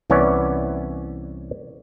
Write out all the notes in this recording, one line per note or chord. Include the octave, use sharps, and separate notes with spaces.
C2 E3 B3 C#4 C#5 D5